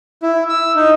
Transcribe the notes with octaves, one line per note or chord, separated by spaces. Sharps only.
E4
E6
D#4